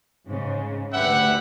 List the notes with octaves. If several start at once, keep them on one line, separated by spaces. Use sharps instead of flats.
G#2 C#3
D2 G4 B4 E5 F#5